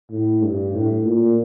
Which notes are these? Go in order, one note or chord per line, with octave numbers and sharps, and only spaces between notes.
A2
G2
A2
A#2